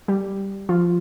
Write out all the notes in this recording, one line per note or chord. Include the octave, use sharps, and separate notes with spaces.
G3 G4
F3 F4